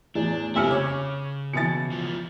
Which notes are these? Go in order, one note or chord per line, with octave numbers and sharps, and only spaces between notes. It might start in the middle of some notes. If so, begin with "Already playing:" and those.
E2 A2 D4
F1 C3 E4 G4 G#5 E6 F6 C#7
C#3 C#5 D6
B2 E3 A6 C#7
F3 B3